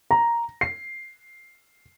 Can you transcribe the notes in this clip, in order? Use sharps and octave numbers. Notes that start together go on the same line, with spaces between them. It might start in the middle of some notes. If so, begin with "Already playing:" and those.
A#5
C7